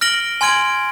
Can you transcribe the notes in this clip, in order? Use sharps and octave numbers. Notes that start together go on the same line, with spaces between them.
F6 A#6 D7 F#7 G7
G#5 C6 F6 G#6 D7 F#7